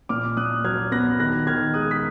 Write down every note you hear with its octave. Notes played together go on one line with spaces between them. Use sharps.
A#2 D6 F6
A#2 D#6 F#6
F#3 F6 G#6
B3 F#6 A#6
D#3 F#6 A#6
D#3 F6 G#6
G#3 D#6 F#6
B6